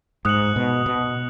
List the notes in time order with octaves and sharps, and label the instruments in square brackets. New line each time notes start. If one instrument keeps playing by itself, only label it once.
[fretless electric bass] G#2 [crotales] D#6 F#6 C#7 F#7
[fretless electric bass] B2
B2